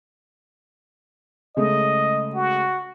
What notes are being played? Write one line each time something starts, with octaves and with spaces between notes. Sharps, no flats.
C#3 G#3 A3 D#5
F#4